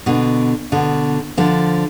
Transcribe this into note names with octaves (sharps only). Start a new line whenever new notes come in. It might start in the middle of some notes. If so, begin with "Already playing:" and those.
B2 D3
B2 D3
D3 F3